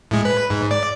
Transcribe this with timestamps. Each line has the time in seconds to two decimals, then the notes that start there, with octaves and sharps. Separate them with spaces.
0.11 A2 G#3
0.25 B4
0.50 G#2
0.71 D5